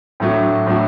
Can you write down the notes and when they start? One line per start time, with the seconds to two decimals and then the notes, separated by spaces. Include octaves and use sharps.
0.20 A2 F#3 A3 D4 F#4
0.66 A2 F#3 A3 D4 F#4